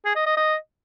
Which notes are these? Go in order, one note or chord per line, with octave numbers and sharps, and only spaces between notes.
G#4
D#5
D#5
D#5